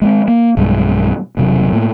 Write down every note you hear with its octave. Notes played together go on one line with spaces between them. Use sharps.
G#3 A3 C4
A#3
B1 G2 G3 G#3
E1 G2 C3 F#3
A2 A#3